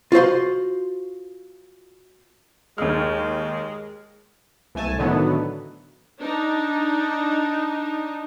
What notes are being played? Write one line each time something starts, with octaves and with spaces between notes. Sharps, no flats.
F4 F#4 C5 C6
D#2 G#3 F6
C2 A3 G#5 A5
A2 D3 D#3 F#3 A3 B3
D4 D#4